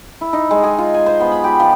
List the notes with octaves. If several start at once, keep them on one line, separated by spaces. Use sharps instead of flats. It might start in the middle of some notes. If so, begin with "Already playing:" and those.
E4
D#4
G#3
G#4
F4
G#5
C5
B3
B5
G4
F3